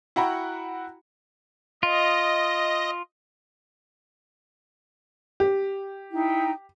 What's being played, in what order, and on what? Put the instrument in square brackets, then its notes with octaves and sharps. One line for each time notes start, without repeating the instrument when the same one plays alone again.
[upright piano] E4 F#4 F#5 G5 A#5 B5
[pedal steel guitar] F4 [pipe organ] D#5
[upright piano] G4
[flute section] D#4 E4 G5